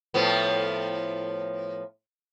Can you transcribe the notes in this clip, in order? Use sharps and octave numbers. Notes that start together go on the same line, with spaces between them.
A2 F3 B3